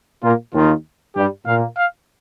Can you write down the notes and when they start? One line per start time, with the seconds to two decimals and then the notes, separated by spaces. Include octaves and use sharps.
0.24 A#2 A#3 F4
0.54 D#2 D#3 F4
1.16 G2 G3 G4
1.46 A#2 A#3 F5
1.77 F5